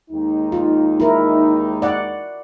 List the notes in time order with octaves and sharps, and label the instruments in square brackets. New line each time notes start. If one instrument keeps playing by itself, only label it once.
[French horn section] D#2 G#3 D#4
[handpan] F4
E4 A#4
D5 F#5